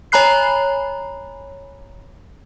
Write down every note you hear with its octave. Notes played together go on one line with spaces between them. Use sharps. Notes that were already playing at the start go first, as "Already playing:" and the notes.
C#5 G#5 A#5 B5 F#6 C7